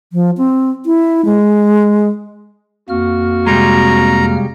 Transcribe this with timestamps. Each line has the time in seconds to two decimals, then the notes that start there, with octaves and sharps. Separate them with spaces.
0.13 F3
0.38 C4
0.86 E4
1.25 G#3
2.89 F2 A#3 F#4 F6
3.47 C3 G3 G#3 A#5